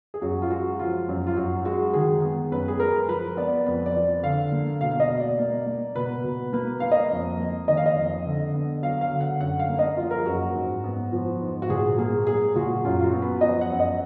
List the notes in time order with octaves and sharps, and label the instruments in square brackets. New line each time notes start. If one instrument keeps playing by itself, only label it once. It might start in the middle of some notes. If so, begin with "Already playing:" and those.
[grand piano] G#4
F#2 F#4
F4
G#3 F#4
F3 F4
F#2
F4
F#2 F#4
G#3 F#4
D#3 G#4
B3
F#2 B4
G#4
G#3 A#4
F3 B4
B3 D5
F2 B4
D5
F3
D3 F5
A#3
B2 F5
F5
D#5
B2
D5
A#3
A#3
B2 B4
B2
A#3 B4
A#3 F5
D#5
F2
A#3
D#3 D#5
F5
D#5
F2
D3
B3
F#3 F5
F5
D3
F#5
F#2 F#5
F5
A#3
D#5
F3 F4
A#4
G#4
F#2 F#4
G#2
B3
F3
G#2
F#4
A#2 G#4
A#3 G#4
F#3 G#4
A#2 F#4
F#2 F4
F4
F#4
B3
B4
F3 D#5
F#5
F#2
D#5